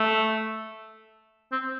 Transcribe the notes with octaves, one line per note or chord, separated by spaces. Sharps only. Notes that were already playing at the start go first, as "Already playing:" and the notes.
Already playing: A3
C4